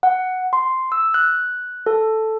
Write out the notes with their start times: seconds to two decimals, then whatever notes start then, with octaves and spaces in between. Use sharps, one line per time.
0.03 F#5
0.53 C6
0.92 E6
1.14 F#6
1.86 A4